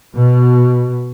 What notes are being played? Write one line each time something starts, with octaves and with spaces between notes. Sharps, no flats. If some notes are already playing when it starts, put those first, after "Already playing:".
B2